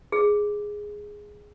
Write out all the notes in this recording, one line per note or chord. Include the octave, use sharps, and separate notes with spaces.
G#4